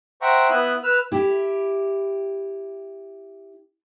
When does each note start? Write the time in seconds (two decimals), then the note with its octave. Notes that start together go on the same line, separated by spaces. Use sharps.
0.22 C5 E5 F#5 G5 A#5 C#6
0.50 B3 E4 E5 D#6 F#6
0.83 B4 E6 F6
1.12 E4 G4